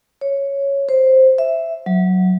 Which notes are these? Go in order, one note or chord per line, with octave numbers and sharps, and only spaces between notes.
C#5
C5
E5
F#3